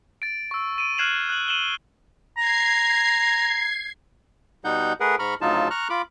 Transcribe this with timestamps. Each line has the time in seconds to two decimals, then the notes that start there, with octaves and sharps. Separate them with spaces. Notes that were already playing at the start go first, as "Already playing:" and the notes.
0.22 A6 D7
0.51 C#6 E6
0.78 D7 D#7
0.98 F6 F#6 G#6 C7 E7 F#7
1.29 F#6 F#7
1.48 D#7 E7 F#7 G7
2.38 A#5 G#6 C7
4.65 B2 G3 D#4 F#5 G6
5.00 A3 G#4 A#4 B4 F#5
5.19 G#2 A#5 B5 C#6 F6
5.41 D2 C#3 F#3 D#4 F4 A5
5.70 A#5 C#6 F6 F#6
5.90 F4 B5 D6